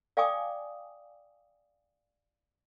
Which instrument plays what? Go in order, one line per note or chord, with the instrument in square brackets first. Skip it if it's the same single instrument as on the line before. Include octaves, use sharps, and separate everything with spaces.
[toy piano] D5 F5 G5 G#5 D6 D#6